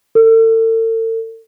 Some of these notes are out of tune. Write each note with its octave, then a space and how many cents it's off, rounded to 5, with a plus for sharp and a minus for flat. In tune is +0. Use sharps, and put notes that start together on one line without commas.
A4 +40